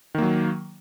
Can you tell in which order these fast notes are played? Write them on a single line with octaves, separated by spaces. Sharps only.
D#3 A#3 F#3